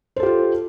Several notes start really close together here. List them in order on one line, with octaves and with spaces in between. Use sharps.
C5 A4 G4 F4